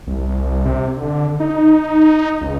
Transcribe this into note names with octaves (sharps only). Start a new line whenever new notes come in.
C2
C3
D3
D#4
C#2